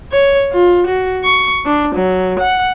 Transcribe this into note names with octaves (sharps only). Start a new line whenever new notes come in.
C#5
F4
F#4
C#6
D4
F#3
F#5